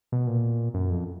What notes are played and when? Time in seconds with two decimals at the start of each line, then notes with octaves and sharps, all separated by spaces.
0.12 B2
0.27 A#2
0.74 F#2
0.90 F2